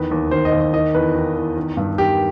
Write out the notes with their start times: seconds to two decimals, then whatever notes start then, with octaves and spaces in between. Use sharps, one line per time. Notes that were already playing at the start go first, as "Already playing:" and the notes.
Already playing: E2 D#3 B4
0.11 D#2
0.31 D#3 C5
0.45 D#5
0.52 D#2
0.60 D#5
0.73 D#3 D#5
0.95 E2 B4
1.15 D#3
1.36 E2
1.57 D#3
1.77 G2
1.98 D#3 G4